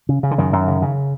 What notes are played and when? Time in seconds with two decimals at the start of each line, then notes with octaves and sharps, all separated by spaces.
0.09 C#3
0.23 C#3
0.31 D3
0.38 F#2 D#3
0.53 F#2
0.68 C#3
0.82 C#3